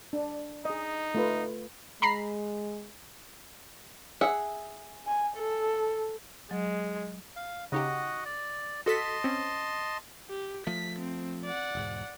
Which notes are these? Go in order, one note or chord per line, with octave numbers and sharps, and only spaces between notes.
D4
D#4 G#4 D#5
A3 F4 B4
G#3 A#5 B5 C7
G#4 E5 F#5
G#5
A4
F#3 G#3
F5
C#3 D#4 F#4 G4 D#5 F#5
D5
F#4 A4 D#5 A5 C6 B6
C4 C#4
G4
F3 A3 B6
C4
D5 F#5
E1 G#2